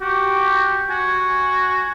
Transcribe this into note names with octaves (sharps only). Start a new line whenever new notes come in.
F#4 G4
F#4 G#5